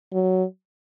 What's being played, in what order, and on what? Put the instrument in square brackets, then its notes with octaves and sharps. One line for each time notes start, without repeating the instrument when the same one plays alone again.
[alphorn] F#3